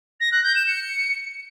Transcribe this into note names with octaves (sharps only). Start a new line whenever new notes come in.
A#6
F#6
G6
E7
C#7